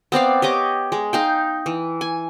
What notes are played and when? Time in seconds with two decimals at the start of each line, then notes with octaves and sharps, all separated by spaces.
0.12 B3 C4 D5 F5
0.42 G4 C#5 D#5 D6
0.92 G#3
1.13 D#4 F5 G5
1.66 E3
2.01 G#5